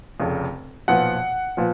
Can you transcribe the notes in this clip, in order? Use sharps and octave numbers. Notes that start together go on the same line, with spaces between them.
F1 F2 C#3
B1 A#2 F3 B3 F#5
A#2 F3 B3